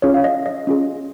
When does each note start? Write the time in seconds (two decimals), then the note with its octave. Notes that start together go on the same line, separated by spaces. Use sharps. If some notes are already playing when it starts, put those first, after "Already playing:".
0.02 C#4 F4 G#4 C#5
0.14 F5
0.24 D#5
0.46 D#5
0.67 C#4 F4 G#4